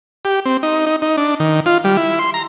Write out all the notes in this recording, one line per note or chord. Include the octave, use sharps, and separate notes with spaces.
G4
C4
D#4
D#4
D#4
D4
D#3
F4
G3
E4
C6
A#5